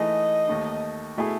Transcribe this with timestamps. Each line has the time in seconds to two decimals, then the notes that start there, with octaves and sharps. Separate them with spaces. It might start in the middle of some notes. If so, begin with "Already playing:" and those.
Already playing: E3 A3 D#4 G#4 D#5
0.48 D#2 D#3 A3 D#4
1.17 B2 A3 E4 G#4